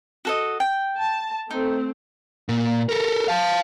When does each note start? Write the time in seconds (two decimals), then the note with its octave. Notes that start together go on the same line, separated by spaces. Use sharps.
0.25 F#4 A4 D#5
0.60 G5
0.98 A5
1.51 A3 C4 D#4
2.49 A#2
2.89 A4 A#4
3.28 F5 A5